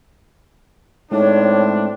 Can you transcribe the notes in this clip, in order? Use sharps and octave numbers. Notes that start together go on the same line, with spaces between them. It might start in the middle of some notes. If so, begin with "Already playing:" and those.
A2 G#3 A3 C4 D4 D#4 C#5